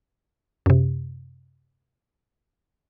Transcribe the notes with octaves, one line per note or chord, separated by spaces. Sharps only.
F#2 C3